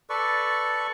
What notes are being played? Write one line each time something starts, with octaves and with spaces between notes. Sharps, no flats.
A4 B4 D5 C#6